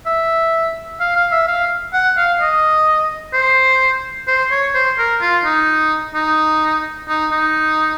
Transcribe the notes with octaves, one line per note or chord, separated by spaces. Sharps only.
E5
F5
F5
E5
F5
F#5
F5
D#5
C5
C5
C#5
C5
A#4
F4
D#4
D#4
D#4
D#4